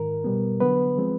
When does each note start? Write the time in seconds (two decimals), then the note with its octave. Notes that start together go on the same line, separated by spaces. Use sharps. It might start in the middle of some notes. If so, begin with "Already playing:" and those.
Already playing: G#2 D#3 A#4
0.24 B2 G3 B3
0.60 D3 F#3 B3 B4
0.98 F3 G#3 C4